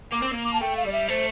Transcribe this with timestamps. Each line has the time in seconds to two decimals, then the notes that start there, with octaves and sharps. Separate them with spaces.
0.12 A#3 D6
0.22 C4
0.32 A#3
0.44 D6
0.53 A5
0.61 A3 G5
0.76 F5
0.84 G3 D5
0.92 E5
1.09 A3 C5